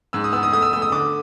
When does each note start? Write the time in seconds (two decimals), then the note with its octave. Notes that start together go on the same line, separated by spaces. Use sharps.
0.13 G#2 E6
0.24 D#6
0.33 B3 E6
0.43 D#6
0.53 A3 D#6
0.62 E6
0.73 A3 E6
0.82 D#6
0.92 D3 D6